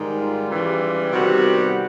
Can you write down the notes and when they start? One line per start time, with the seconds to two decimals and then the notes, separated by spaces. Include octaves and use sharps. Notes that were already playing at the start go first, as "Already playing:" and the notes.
Already playing: G#2 D#3 G3
0.19 F4
0.50 C#3 E3 G3
1.12 C3 D#3 G3 B3 F#4